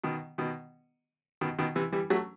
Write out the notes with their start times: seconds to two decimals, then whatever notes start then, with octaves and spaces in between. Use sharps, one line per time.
0.04 B2 D#3
0.38 B2 D#3
1.41 B2 D#3
1.59 B2 D#3
1.75 C3 E3
1.92 E3 G3
2.10 F#3 A3